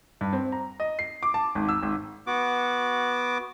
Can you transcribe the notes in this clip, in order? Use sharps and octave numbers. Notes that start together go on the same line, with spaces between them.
G2
C4
A#5
D#5
C7
D6
A5
G#1
E6
G#1
B3 F#4 D6